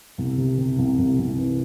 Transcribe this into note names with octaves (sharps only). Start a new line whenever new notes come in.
C2
C3
C3
C2
C2
C2
E3